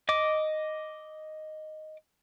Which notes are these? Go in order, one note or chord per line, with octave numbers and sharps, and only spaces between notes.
D#5 D6